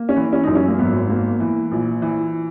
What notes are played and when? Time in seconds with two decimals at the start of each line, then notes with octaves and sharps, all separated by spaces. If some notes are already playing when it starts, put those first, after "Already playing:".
Already playing: A#3
0.09 C#4
0.16 E3
0.33 C#4
0.43 F#2 D#4
0.55 C#4
0.68 A#3
0.78 G#1 B3
1.10 A#3
1.40 E3
1.72 A#1
2.02 E3